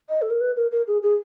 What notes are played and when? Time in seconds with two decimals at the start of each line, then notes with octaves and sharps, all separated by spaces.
0.09 D#5
0.22 A4
0.30 A#4
0.40 B4
0.56 A#4
0.71 A#4
0.87 G#4
1.02 G#4